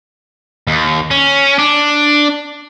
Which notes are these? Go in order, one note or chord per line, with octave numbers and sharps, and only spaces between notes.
D#2
C#4
D4